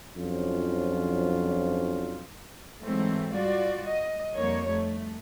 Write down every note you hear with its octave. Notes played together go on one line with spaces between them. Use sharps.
F2 F3 F#3 C#4 D4 F4
G#2 E3 F#3 A3 C4
G3 F4 F#4 D5
D#5
F2 G3 A#3 D#4 C#5
A3